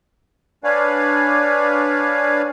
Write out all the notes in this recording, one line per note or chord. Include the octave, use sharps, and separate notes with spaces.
D4 B4 C#5 D5 F5 G#5